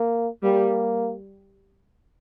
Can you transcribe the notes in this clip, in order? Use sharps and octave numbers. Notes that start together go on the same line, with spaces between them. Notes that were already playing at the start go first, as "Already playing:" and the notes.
Already playing: A#3
G3 A#3